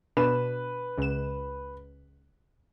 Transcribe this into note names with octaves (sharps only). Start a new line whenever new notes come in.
B2 D4 B4 E7
C#2 E7